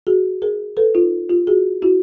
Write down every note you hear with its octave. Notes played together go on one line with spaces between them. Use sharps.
F#4 G#4
G#4 A#4
A4 B4
D#4 F4
F4 G4
F#4 G#4
E4 F#4